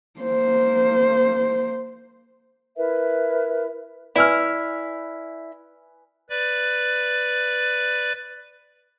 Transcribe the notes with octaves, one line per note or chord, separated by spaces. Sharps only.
A#3 C5
E4 A#4 B4 E5
E4 B4 D5 G#5 E6 F6
B4 D5